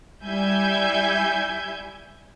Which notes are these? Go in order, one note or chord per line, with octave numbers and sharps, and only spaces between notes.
G3 E4 E5 G#5 G6 G#6